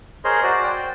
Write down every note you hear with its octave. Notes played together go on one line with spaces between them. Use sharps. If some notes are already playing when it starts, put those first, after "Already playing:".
G#4 A#4 C5 C#5 D#5 C6
F#4 C5 D5
G5